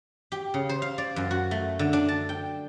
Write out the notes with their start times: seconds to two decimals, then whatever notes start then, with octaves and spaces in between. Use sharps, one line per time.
0.32 G4
0.54 C#3
0.69 C5
0.82 F5
0.98 D5
1.16 F#2
1.31 F#4
1.51 A3
1.79 D3
1.93 D4
2.09 A5
2.29 G5